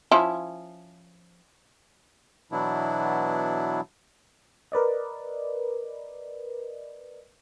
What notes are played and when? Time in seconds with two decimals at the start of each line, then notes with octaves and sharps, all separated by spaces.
0.11 F3 C#4 E4
2.52 B2 E3 F#3 B3 D4 E4
4.72 A#4 B4 D5 D#5